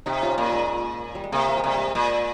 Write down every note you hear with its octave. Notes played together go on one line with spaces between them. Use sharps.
C3 D#4 G4
C#4 F4
A#2 A#3
G#3
G3
G#3
C3 A#3
A#3
G#3
C3 G3
G#3
A#2